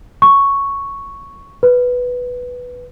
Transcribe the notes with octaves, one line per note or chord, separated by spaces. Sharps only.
C#6
B4